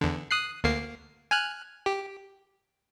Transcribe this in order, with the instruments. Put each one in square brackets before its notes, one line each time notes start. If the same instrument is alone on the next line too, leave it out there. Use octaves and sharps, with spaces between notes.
[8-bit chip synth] E2 D3
D#6 F#6 C7
D2 A#3 C7
G#5 F6 F#6
G4